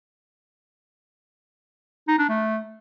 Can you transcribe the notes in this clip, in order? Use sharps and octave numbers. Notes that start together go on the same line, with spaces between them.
D#4
D4
A3